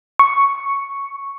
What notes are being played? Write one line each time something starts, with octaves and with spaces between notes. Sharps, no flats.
C#6